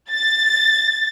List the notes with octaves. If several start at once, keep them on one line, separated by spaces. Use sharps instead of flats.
A6